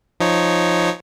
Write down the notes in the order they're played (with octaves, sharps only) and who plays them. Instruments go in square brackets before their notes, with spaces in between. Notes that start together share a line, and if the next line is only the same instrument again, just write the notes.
[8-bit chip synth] F3 D#4 C#5